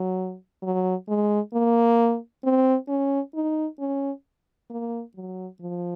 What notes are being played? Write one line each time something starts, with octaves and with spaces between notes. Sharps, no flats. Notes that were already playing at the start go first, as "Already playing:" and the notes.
Already playing: F#3
F#3
G#3
A#3
C4
C#4
D#4
C#4
A#3
F#3
F3